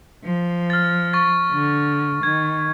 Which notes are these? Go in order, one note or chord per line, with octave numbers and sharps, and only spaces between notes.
F3
F6 A6
C#6 A6
D3
D#3 G#6